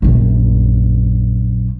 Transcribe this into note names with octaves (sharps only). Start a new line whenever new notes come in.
A#1 F#2